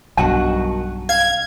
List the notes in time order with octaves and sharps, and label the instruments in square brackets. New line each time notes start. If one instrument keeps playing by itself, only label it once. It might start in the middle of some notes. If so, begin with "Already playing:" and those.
[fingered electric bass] B1 G2 [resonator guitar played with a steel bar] D#3 F#4 F#5 [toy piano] A5
[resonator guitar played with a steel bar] F5 [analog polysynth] G#6